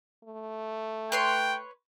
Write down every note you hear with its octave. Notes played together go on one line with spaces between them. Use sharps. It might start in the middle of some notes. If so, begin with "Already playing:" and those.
A3
B4 C#5 G5 C6